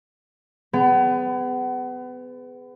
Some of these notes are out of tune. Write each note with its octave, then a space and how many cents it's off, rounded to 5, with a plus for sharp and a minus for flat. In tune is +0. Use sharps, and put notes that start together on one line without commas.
B3 +30 G#4 +0